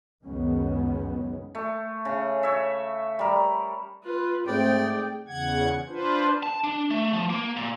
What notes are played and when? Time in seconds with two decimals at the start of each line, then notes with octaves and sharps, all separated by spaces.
0.24 C#2 F#2 D#3 G#3 B3 C#4
1.55 A3
2.05 C#3
2.43 C#5 E5
3.19 G3 A#4
4.04 F4 B4
4.47 G#2 A3 C4 G#4 D5 G5
5.28 E2 C#3 F#5 G#6
5.88 D4 F4 B4 C5
6.43 A5
6.64 D4
6.91 A3
7.13 F3
7.30 A#3
7.57 A#2